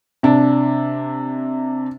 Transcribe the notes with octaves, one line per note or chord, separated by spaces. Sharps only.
C3 D4